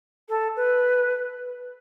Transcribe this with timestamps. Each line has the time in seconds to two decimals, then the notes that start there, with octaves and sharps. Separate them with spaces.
0.28 A4
0.56 B4